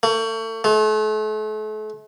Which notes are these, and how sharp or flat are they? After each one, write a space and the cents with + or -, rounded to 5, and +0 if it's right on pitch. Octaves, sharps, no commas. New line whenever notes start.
A3 +35
A3 -40